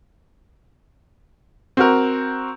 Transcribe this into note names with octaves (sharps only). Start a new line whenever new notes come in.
C4 F#4 A#4